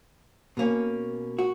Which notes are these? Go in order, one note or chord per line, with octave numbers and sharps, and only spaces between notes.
B2 A#3 C#4
F#4